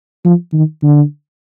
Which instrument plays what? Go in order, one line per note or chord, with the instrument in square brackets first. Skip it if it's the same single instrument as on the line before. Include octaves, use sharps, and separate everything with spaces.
[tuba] F3
D#3
D3